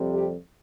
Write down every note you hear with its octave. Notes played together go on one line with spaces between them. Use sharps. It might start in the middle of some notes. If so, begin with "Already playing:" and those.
Already playing: F2 C3 G3
G4